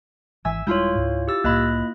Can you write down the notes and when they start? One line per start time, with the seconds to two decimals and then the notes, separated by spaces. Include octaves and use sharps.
0.45 G#1 E3 E5 G#5 E6
0.67 D#1 G3 G#3 E4 F4 C#5 C6 G6
0.95 C#2 G#2
1.28 G4 E6 A6
1.44 C2 A2 A#3 D#5 B5 F#6